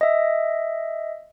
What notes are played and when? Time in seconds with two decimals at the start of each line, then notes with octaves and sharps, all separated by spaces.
0.01 D#5 E5